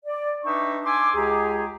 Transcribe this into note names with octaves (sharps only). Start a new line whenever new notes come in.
D5
D4 D#4 B4 E5 G5 C#6
G#5 C6 D6 E6
C#2 G4 G#4 A#5